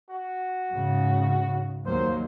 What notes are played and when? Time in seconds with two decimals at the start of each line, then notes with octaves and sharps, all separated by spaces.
0.10 F#4
0.71 G#2 C#3
1.86 D#2 F#3 A#3 C5